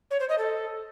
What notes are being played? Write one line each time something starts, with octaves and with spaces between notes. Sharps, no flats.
C#5
C5
D#5
A4